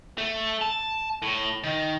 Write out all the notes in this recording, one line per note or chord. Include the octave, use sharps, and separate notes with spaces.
A3
A5
A2
D#3